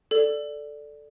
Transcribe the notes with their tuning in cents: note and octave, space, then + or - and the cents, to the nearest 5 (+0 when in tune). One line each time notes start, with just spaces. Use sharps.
A4 +0 D5 +0